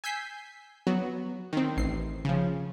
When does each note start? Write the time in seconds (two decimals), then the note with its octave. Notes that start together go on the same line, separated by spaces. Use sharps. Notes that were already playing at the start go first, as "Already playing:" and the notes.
0.04 G#5 E6 G6 B6 C7
0.87 F#3 B3 F#4
1.53 D#3 C4
1.77 A1 C7
2.25 C#3 F3